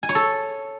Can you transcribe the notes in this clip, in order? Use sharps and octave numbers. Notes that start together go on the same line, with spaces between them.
G#5
C#5
A4